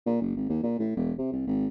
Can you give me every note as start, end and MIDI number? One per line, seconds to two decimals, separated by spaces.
0.06 0.20 46
0.21 0.32 30
0.37 0.49 32
0.49 0.60 39
0.63 0.74 46
0.79 0.94 45
0.96 1.13 28
1.18 1.32 48
1.32 1.43 36
1.47 1.68 32